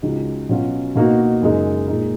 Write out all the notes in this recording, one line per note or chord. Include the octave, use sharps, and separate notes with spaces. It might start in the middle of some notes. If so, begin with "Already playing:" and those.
C#2 C#3 G#3 D#4 F#4
B2 F#3 C#4 F4
B2 A#3 D#4 F#4
F#2 C#3 G#3 D#4
A#2 G#3 D#4